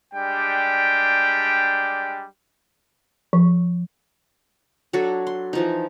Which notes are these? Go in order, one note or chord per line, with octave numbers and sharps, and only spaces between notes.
G3 G#3 D4 G4 G5
F3
F#3 D4 F#4 A4
C6
E3 F3 D#4